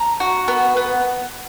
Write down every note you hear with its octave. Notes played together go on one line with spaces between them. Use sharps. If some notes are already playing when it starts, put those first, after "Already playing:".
Already playing: A#5
F#4
B3
B3